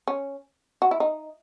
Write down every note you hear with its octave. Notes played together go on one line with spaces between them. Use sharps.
C#4
F#4
E4
D#4